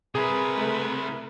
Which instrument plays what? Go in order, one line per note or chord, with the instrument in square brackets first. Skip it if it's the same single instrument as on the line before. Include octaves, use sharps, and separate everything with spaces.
[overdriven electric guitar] C3 E4 [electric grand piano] G#4 [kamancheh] A#4 B4
[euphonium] A3